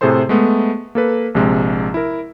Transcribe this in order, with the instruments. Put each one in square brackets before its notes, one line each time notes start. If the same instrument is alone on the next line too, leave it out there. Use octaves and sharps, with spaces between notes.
[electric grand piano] A2 C3 G#4 A4 C5 C6
G#3 A3 B3
A#3 A4 B4
A#1 C3 G#3
E4 A#4